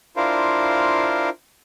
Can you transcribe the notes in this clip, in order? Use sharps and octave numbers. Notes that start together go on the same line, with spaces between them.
D4 E4 F4 A#4 C5 F5